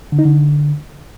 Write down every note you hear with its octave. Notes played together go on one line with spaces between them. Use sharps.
D3
D#4
D3